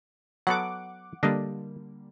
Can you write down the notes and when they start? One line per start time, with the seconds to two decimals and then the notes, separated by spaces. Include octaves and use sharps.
0.47 F#3 B3 A4 F#5 D6
1.23 D3 G3 A#3 D4 D#5